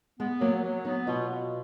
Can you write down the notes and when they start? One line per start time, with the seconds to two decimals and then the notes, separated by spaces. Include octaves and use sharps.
0.19 G#3 B3
0.41 F#3 A#3
0.63 F#3
0.85 B3 D#4
1.07 B2 F4
1.29 B2